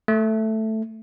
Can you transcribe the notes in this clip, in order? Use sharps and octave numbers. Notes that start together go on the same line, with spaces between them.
A3